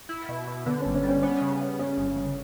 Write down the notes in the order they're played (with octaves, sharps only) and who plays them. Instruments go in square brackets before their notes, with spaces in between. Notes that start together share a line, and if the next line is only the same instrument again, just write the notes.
[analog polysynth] E4
B2
B2
[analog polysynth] D3 [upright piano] B3
[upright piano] C#4
[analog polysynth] G1
[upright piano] C#4
[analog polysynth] G3
[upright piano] C#4
[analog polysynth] B3 [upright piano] C#4
[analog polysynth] C#3
C#3
[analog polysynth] C#3 [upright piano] C#4
[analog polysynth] G1
G1